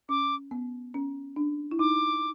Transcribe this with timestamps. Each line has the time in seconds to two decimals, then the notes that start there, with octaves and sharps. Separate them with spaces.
0.09 C#4 D6
0.51 B3
0.94 C#4
1.36 D4
1.71 E4
1.79 D#4 D6